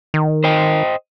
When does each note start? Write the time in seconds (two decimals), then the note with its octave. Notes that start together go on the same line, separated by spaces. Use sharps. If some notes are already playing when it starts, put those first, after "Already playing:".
0.14 D#3
0.44 C5 D#5 G5